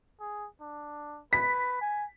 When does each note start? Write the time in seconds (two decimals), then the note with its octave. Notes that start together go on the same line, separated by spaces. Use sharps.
0.20 G#4
0.61 D4
1.33 B4 B6
1.81 G#5